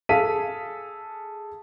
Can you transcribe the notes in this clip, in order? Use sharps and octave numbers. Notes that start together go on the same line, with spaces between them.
G#4 A4 F5 B6 D#7